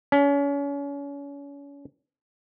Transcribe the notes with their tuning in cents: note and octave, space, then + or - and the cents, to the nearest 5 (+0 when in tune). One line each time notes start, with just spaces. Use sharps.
C#4 +35